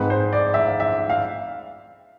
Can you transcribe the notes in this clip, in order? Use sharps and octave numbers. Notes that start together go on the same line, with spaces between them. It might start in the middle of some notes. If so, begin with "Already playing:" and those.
Already playing: G#2 G#3 C4 B4
C5
D5
E5
F5
E5
F5